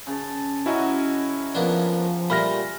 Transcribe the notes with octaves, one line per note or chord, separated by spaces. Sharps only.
C#3 A5
F#3 C#4 E4 F#4 D#5
F3 A#3 B3 D4
A#2 G3 A3 B5 F6 A#6